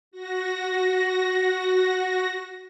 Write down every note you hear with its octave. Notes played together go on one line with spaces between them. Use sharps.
F#4 A#6